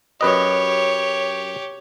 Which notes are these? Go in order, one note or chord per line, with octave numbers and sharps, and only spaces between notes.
F#2 G4 B4 C#5 D#5